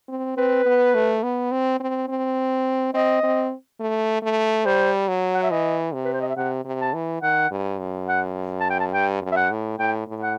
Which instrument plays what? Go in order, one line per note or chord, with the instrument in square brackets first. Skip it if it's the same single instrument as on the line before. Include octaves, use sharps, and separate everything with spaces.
[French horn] C4
[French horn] C4 [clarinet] B4
[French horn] B3
A3
B3
C4
C4
C4
[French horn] C4 [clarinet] D#5
[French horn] C4
A3
A3
[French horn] G3 [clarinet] C5
[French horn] F#3
[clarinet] F#5
E5
[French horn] E3 [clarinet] D#5
[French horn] C3
[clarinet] B4
C5
D#5
E5
[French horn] C3 [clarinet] F#5
[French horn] C3
[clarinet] A5
[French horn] E3
[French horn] D#3 [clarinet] F#5
[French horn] G2
F#2
[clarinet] F#5
A5
G5
A5
[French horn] G2 [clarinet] G5
[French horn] F#2
[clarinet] E5
F#5
[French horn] A2
[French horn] A2 [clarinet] G5
[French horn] A2
[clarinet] F#5